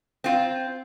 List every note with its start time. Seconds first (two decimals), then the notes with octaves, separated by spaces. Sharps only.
0.24 C4 F4